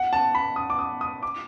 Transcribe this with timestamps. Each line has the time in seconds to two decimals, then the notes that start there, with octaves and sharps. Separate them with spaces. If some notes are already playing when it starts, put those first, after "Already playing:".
Already playing: F#5
0.13 A5
0.35 B5
0.56 D#6
0.70 D6
0.79 D#6
1.01 D#6
1.23 D6